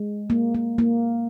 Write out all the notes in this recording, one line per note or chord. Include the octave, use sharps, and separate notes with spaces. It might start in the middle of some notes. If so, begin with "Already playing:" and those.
Already playing: G#3
A#3
A#3
A#3